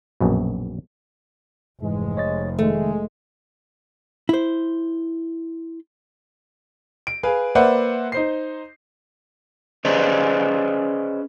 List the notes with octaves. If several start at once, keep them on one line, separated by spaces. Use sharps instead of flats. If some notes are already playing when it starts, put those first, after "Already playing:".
A#1 F#2 B2
F1 G#2 E3 G#3
C#5 D#5 A6
D#3 G#3 A3
E4 C5
D7
G#4 B4 F5
A#3 B4 C5 D5 E5 F#5
D#4 C5 C7
C#4 G#4 B4 C5 D5 D#5